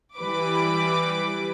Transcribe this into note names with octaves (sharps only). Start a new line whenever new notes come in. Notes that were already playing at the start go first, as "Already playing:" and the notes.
E3 G3 B4 D6